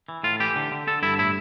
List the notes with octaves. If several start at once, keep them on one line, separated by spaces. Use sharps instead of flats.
E3
A2 F4
E3 G4
D3
D3
D3 A4
G2 E4
A2 E4